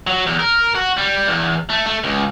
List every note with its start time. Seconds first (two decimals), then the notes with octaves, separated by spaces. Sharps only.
0.07 F#3
0.27 E2
0.39 A#4
0.75 F#4
0.98 G3
1.28 E2
1.70 A3
1.86 A3
2.04 C#2